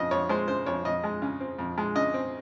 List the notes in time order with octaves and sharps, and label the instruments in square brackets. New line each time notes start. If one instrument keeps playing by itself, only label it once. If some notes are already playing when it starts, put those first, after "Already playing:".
Already playing: [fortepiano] F2 C#3 D#5
F2 C#5
G#3 C5
C#3 C5
F2 C#5
F2 D#5
G#3
C#3
C4
F2
G#3
C#3 D#5
C4